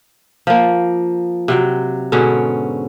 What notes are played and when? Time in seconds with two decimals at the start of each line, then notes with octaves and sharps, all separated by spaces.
0.47 F3 A#3
1.48 C3 F#3 G5
2.12 G#2 B2 D3 C#4